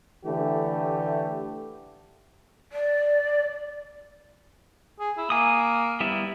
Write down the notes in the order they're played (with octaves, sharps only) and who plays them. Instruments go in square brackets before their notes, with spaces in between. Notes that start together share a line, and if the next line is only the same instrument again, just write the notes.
[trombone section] D3 E3 A3 G4
[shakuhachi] D5
[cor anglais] G#4
E4
[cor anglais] A#3 [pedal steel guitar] G#5 D#6
[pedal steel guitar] G3 B3 E4